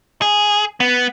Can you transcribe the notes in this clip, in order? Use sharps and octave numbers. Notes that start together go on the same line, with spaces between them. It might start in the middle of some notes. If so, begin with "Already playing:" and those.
G#4
B3